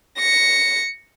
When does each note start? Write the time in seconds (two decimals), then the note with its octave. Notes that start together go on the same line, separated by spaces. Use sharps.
0.17 A#6 C#7